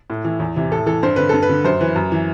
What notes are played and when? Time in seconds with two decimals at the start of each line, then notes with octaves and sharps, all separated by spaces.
0.10 A2
0.25 E3
0.40 E2
0.56 C3 E3
0.72 A2 A4
0.86 E3 A4
1.03 G2 C5
1.16 D3 B4
1.29 G2 A4
1.43 B4
1.49 D3
1.65 F#2 C5
1.81 E3 B4
1.96 F#2
2.12 E3